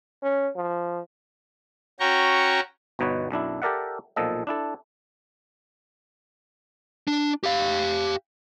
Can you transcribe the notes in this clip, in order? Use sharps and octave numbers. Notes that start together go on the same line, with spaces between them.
C#4
F3
C#4 F#4 G5 A#5 C#6
G1 B2 D#4 B4 C#5
B1 F#2 D4 E4
G4 A4 A#4 D5 E5 F#5
B1 A#2 F3 A4 D#5
D4 E4 A4
D4
G4 F5